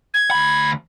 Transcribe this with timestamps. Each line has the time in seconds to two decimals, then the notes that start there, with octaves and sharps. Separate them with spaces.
0.14 G#6
0.31 D2 B5